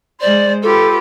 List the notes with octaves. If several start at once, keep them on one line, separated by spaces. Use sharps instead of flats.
G#3 C5 D5
F4 G4 A4 B4